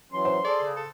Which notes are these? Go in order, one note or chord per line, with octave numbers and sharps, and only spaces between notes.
E3 F#3 C#4 C6
C5
G#4 A4 D5
C#3
A4